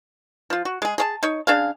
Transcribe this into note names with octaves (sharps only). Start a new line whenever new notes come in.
F3 F4
F#4
G#3 G#4
G#4 C#5 A5
D#4 C#5
C#3 D4 G#4 F5